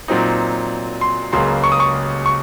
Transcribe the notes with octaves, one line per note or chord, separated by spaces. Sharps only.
A#2 F#3 C4 D#4
C6
C#2 C#3 F#3 A#3 C#4 C6
C#6
D#6
C#6
C#6